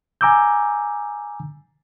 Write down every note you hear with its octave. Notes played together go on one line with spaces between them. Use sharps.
G#5 A#5 D6 E6 G6